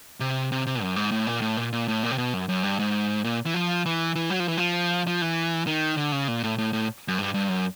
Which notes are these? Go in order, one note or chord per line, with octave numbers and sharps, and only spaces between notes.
C3
C3
C3
F#2
G#2
A2
A#2
A2
A#2
A#2
A2
A#2
C3
B2
F#2
F#2
G2
G#2
A#2
E3
F3
E3
E3
F#3
F3
E3
F3
F3
E3
D#3
D3
C#3
A#2
A2
A2
A2
F#2
G2
G2
F#2